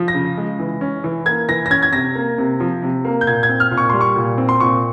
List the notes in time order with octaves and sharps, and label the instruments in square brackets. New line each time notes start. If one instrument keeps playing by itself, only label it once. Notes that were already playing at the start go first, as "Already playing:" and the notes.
Already playing: [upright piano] F3
A#6
C#3
G#3
E3
C#4
E3
A#3 G#6
E3 A#6
A#6
C#4 G#6
G#6
C3 A#6
A#3
C3
F3
C3
A#3
G6
A#2 G#6
G#6
C4
F6
A#2
C#6
G3 C6
C#6
A#2
C4
C6
A#2 C#6